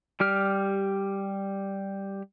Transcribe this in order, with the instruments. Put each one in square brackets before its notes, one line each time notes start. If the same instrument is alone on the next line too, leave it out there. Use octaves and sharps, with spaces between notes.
[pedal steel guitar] G3 G4 F6